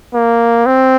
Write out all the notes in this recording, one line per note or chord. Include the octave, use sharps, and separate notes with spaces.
A#3
C4